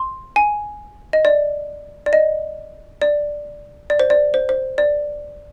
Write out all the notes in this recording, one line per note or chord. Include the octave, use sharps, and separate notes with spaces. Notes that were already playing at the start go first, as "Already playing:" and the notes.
Already playing: C6
G#5
D#5
D5
D5
D#5
D5
D5
C5
D5
C5
C5
D5